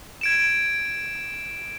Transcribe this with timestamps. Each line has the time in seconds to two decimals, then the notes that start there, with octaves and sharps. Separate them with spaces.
0.21 G#6 D7 E7